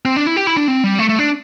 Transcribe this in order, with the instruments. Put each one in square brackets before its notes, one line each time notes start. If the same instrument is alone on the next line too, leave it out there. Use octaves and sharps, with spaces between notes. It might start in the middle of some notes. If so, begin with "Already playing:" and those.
[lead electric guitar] C4
D4
E4
G4
E4
D4
C4
G3
A3
A3
D4